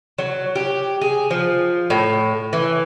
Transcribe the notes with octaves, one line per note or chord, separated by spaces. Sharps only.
F#3
G4
G#4
F3
A2
E3